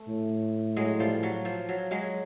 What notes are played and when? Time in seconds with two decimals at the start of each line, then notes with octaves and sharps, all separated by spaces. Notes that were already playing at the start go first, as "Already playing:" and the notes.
Already playing: A3
0.08 A2
0.76 F#3 G#3
1.00 F3 G3
1.23 F#3
1.45 F3
1.69 F#3
1.91 F#3 G#3